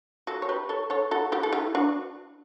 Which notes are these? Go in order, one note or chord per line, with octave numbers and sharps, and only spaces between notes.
F#4 A4
C#5
G4 B4
A4 C#5
A4 C#5
F#4 A4
E4 G4
A4
E4 G4
D4 F#4